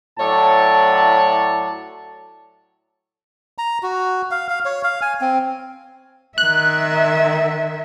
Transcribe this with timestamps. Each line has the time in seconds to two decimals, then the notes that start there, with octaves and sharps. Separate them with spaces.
0.19 A2 F#3 A4 C#5 D5 A5
3.58 A#5
3.83 F#4
4.31 F5
4.49 F5
4.65 C#5
4.84 F5
5.02 G#5
5.21 C4
6.38 D#3 E5 F#6